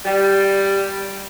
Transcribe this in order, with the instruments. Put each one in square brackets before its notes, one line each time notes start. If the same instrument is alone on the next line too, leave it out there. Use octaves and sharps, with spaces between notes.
[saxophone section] G3